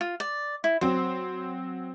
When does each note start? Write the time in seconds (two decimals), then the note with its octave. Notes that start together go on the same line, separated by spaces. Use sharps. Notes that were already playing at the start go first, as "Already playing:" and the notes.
0.01 F4
0.20 D5
0.64 E4
0.81 F#3 C4 C5